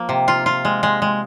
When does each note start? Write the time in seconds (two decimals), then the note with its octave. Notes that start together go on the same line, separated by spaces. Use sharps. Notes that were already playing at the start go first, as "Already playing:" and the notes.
Already playing: F3 A#3
0.09 C3
0.28 F4
0.46 F4
0.65 G#3
0.83 G#3
1.02 G#3